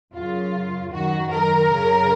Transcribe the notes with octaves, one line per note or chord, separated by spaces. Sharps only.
F#2 C#3 F4
F#2 D#3 F#4
A#4
F#2 C#3